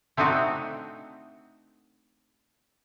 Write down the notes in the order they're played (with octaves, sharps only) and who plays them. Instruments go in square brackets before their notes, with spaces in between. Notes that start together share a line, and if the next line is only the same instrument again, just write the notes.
[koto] A3 C4 D4 D#4 F#4